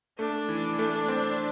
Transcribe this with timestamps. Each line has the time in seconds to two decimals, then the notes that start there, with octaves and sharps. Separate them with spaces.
0.19 A3 D4
0.49 E3
0.79 A3
1.08 C4